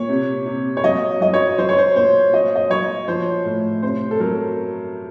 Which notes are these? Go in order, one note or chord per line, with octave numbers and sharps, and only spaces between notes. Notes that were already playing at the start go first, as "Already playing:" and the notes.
Already playing: A#2 C#5
C3
C3
C#5
F#3 D#5
F#3 D#5
C#5
F#3 C5
C#5
C5
A#2 C5
F#3 D#5
D#5
F#3 C#5
F3 C5
A2
C3 C5
A4
F#3 A#4